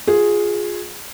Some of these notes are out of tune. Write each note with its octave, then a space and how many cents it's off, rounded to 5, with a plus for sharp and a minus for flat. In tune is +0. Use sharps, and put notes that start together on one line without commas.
F4 +20 G#4 +0